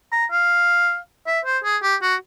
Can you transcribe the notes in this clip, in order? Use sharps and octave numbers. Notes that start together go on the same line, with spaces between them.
A#5
F5
E5
C5
G#4
G4
F#4